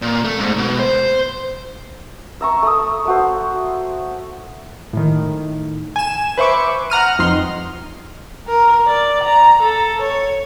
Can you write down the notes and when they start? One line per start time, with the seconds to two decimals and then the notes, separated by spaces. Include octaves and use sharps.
0.02 A#2
0.25 A3
0.40 G#2
0.58 B2
0.79 C5
2.41 E5 A#5 C#6
2.63 A3 D#6
3.05 A3 F#4 C5
4.93 A2 D#3
5.96 G#5 E7
6.38 B4 C5 E5 C#6 D6
6.90 F#5 A#5 F6 D#7
7.19 F2 D#4 C6 F6
8.48 A#4
8.87 D5
9.24 A#5
9.62 A4
10.02 C#5